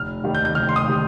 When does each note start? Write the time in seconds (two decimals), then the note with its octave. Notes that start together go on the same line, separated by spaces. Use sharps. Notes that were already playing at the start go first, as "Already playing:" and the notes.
Already playing: F1 F6
0.24 D#2 D#3 G3
0.35 G6
0.45 G6
0.55 F1 F6
0.69 C6
0.76 D#6
0.87 D#3 G3